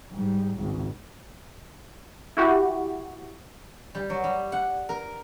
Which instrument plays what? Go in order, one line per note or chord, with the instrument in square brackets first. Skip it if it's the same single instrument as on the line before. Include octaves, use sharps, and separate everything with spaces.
[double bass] G#2 G3
G#1 C#2
[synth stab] E4 F#4 G4
[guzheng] G3
F#3
G3
F#5
A#4